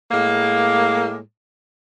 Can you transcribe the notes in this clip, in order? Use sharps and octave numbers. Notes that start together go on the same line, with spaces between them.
A2 G#3 A#3